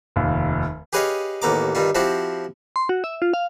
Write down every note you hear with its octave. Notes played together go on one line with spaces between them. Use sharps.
F1 D#2
G4 G#4 B4 C#5 D#5 F5
A1 D#2 B3 A#5 D6
G2 D#3 G3 F4
F3 C4 E4 F#4 G4
C6
F#4
E5
F4
F5